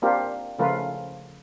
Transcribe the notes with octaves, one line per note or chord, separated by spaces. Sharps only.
A#3 C4 D4 F4 G4 A#4
C#3 F3 A3 F4 A#4 B4